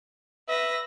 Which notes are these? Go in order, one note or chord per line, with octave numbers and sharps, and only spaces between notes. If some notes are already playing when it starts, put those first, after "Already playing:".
B4 E5 A#6